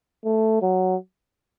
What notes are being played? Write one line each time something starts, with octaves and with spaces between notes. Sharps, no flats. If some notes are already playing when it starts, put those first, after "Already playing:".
A3
F#3